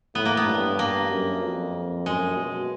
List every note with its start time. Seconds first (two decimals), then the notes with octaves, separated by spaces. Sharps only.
0.15 A2 B3
0.25 A#3
0.37 B3
0.47 G2
0.79 A#3
1.10 F#2
1.42 F2
2.05 F#2 G#3
2.37 B2